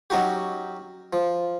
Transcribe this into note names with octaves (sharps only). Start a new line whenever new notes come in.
F#3 C#4 D#4 F#4 G4
F3